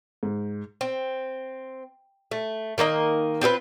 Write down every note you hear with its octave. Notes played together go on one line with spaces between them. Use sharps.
G#2
C4
A3
D#3 A#3 A#4 D#5
C4 F4 G#4 B4